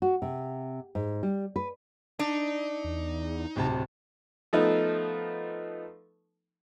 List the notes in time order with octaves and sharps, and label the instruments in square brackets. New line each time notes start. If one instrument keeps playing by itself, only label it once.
[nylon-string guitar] F#4
C3
G#2
G3
B4
[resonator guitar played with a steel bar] D4 [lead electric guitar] D#4
[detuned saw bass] E2
[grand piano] D1 C3 A5
[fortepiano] F3 A3 B3 D#4